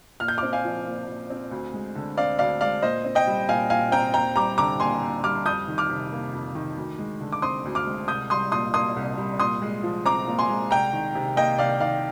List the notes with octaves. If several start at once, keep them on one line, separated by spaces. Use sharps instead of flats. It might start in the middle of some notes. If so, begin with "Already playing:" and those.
A#2 F6
G6
C4 D6 F6
F5 G#5
F3
A#2
A#2
C4
D2
G#3
D3
C4 D5 F5
D2 D5 F5
G#3 D5 F5
A#2 C5 D#5
C4
D#5 G5
G3
A#2 F5 G#5
A#2 F5 G#5
C4 G5 A#5
D#2 G5 A#5
G3 A#5 D6
D3 A#5 D6
D#2 G#5 C6
D#2
G3 D6 F6
F2 D#6 G6
D#3
D6 F6
C3
A#3
F2
D#3
D2
G#3
D3
D6
C4 C6 D#6
D2
D6 F6
G#3
C2 D#6 G6
G3 C6 D#6
A#2 C6 D#6
A#3 C6 D#6
C2
G3
A#2 C6 D#6
G#3
F3
C4 A#5 D6
A#2
G#5 C6
G#3
C2 G5 A#5
D#3
C3
A#3 D#5 G5
C2 D5 F5
D#3 D5 F5